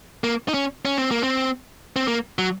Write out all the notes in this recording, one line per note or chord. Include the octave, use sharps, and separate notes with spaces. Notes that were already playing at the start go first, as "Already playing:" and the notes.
A#3
D#4
C#4
C#4
C4
A#3
C4
C4
A#3
F#3